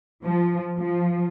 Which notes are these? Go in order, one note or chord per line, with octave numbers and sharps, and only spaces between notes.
F3
F3